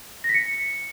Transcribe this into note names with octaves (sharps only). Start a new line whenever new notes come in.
A#6
B6
C#7